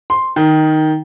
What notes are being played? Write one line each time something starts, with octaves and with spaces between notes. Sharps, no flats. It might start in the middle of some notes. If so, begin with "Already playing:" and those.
C6
D#3